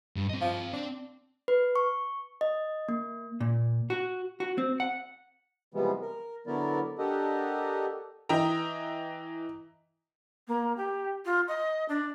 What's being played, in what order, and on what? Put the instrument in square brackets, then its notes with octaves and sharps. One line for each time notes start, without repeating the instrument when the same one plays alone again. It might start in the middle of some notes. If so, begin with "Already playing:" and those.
[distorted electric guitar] G2
C4 D#5
[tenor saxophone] F3
[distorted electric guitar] C4 [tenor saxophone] D4
[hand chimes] B4
C#6
D#5
A#3
[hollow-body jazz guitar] A#2
F#4
F#4
C4
F#5
[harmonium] C3 E3 F3 G3 G#3 B3
A#4
D3 F#3 B3 E4 A#4 D5
D4 G4 A4 A#4 D#5 F#5
[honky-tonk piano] E3 D#5 E5 G5 A#5
[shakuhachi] A#3
G4
F4
D#5
D4